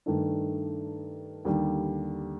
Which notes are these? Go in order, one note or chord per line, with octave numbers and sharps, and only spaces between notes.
G2 D#3 A3 D4
D#2 D3 G3 D4